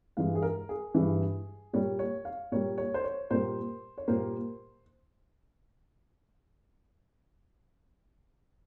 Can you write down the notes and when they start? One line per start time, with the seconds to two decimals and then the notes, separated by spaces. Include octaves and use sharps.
0.17 G2 E3 G#3 F5
0.35 G#4
0.42 A#4
0.69 G#4
0.94 G2 E3 G#3
1.73 A#2 G3 A#3 C#5
1.99 C#5
2.25 F5
2.52 A#2 G3 A#3 C#5
2.78 C#5
2.94 C5
3.04 C#5
3.30 A#2 G3 A#3 C5
3.98 C#5
4.08 A#2 G3 A#3 C5